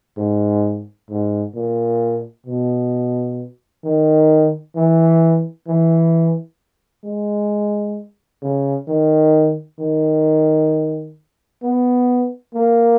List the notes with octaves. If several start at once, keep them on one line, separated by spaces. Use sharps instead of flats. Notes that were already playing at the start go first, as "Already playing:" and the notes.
G#2
G#2
A#2
B2
D#3
E3
E3
G#3
C#3
D#3
D#3
B3
A#3